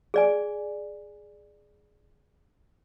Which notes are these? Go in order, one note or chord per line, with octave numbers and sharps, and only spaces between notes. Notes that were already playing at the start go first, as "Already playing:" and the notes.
G#4 D5 G#5